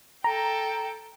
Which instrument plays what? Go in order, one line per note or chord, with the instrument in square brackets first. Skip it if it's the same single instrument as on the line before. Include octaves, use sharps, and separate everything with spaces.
[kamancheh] A4 G5 [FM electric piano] A#5